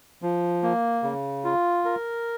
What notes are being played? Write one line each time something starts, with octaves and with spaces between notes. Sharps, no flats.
F3
A#3
C#3
F4
A#4